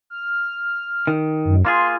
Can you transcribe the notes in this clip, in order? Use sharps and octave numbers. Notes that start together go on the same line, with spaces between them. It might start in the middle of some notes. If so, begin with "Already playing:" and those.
F6
D#3
F#2
A#3 F4 G#4 C6